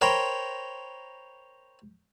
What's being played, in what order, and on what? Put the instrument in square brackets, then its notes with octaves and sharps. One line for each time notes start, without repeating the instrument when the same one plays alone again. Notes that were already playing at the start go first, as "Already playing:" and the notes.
[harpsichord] A#4 C5 C#5 G5 B5